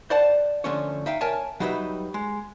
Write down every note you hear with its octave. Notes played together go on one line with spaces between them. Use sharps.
C5 D5 F#5 A5
D3 F3 A3 C#4 C#5
D#4 E5 F5 G5
A#4 C#5 E5 G#5 A5
F#3 G3 D#4 B4 D#5 E5
G#3